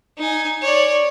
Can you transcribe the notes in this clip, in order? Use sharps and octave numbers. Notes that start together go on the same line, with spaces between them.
D#4 G#5
C#5 D5